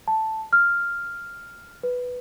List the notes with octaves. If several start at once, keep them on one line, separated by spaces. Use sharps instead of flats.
A5
F6
B4